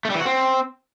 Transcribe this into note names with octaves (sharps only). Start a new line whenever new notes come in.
A3
G3
E3
F#4
C4